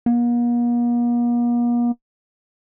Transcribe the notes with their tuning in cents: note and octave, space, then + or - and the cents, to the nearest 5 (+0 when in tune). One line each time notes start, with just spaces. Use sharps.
A#3 +45